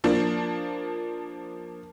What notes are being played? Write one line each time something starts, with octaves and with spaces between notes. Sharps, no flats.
F3 A#3 D4